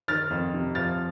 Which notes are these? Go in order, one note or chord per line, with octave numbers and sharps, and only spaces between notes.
D#3 F6 A6
F2
C3
F3 F6 A6